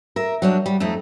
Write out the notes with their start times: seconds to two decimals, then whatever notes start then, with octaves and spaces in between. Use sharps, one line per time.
0.16 A#4 E5
0.42 F#3 G3 D4
0.66 G3
0.80 F2 A3 D#4